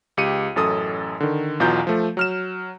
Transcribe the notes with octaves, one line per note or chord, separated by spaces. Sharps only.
C#2 G4 C#7 D#7
A1 F#2 A4 D#6
D3 D#3
B1 E2 B2 F4 A#5 G6
F3 A3
F#3 F6 E7